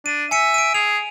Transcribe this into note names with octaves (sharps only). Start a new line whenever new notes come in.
D4 D#7
E5 G#5 C#7 D#7
D7 D#7
G#4 F7